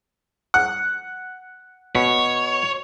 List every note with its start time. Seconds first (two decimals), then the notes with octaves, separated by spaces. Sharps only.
0.54 F#5
1.95 B2 C#5